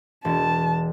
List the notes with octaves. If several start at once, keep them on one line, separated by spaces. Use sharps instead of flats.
E1 A5